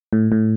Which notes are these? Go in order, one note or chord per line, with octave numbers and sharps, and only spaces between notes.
A2
A2